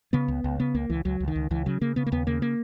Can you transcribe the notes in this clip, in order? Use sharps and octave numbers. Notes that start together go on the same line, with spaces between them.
C#3 B3
C#2
C#2
C#3 B3
C#2 A#3
C#2 E3
C#2 F#3
C#2
D#3
C#2
C#2 E3
C#3 F#3
C#3 A#3
C#3 B3
A#3
D#2 B3
C#3 A#3
A#3